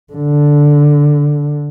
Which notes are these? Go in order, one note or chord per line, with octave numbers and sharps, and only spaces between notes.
D3